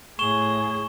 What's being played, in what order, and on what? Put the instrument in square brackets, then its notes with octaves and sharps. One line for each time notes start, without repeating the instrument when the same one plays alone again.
[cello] A2 G#4 [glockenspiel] C#6 E7 G7